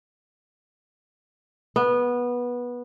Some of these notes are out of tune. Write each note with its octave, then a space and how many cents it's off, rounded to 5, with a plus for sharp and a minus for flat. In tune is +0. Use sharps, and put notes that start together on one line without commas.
B3 -15